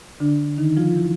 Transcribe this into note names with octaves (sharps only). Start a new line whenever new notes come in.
D3 D4
D#3 D#4
F3 F4
E3 E4